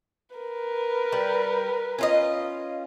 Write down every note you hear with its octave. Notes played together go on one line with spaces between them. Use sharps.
A#4 B4
G3
C#4 F4 D#5